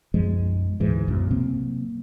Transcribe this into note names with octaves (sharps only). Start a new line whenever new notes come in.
B1 F#2 F3 G#3
D2 G#2 E3
B1 F#2
C3 F#3 A#3 C4